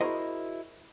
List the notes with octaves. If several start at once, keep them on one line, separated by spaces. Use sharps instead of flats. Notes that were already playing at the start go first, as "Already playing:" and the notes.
E4 F#4 G#4 A#4 C5 D#5